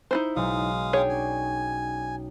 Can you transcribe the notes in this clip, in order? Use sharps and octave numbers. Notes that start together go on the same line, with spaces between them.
D#4 E4 C5
B1 G#3 F5 D#6
D4 D#4 G#4 C#5 G5
C#4 G#5